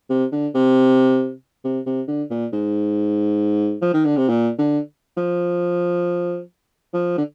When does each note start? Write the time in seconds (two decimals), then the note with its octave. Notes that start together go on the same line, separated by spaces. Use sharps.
0.10 C3
0.32 D3
0.54 C3
1.64 C3
1.86 C3
2.08 D3
2.30 A#2
2.53 G#2
3.82 F3
3.93 D#3
4.05 D3
4.17 C3
4.29 A#2
4.58 D3
5.17 F3
6.93 F3
7.18 D3